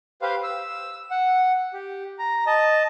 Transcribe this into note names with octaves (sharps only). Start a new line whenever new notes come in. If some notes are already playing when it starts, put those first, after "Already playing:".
G4 B4 C5 F5
E6
F#5
G4
A#5
D#5 A5